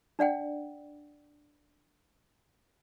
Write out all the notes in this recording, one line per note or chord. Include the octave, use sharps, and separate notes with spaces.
D4 D5 F#5 G5